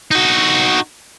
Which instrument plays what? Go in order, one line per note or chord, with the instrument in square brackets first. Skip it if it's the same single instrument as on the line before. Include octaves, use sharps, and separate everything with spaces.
[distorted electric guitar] D#4 F#4